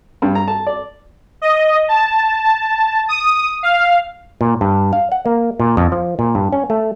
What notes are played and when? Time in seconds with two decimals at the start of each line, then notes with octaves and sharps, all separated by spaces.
0.22 G2
0.35 A#5
0.48 A5
0.67 D5
1.42 D#5
1.88 A5
3.08 D#6
3.63 F5
4.41 A#2
4.61 G2
4.93 F5
5.12 F#5
5.26 A#3
5.60 A#2
5.77 F2
5.92 F3
6.19 A#2
6.35 G2
6.53 C#4
6.70 A3